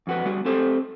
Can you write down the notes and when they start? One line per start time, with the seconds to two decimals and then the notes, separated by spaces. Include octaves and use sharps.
0.07 F2 F#4 B4
0.25 G3 B3 F#4
0.45 C4 G4 A4 C5